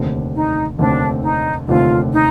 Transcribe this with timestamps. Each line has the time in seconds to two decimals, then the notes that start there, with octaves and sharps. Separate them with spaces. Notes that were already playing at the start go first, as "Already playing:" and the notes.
Already playing: F1 D#2 D3 A3 C4
0.34 D#4
0.78 F1 D#2 D3 A3 C4 D4
1.23 D#4
1.67 F1 D#2 D3 A3 C4 F4
2.12 D#4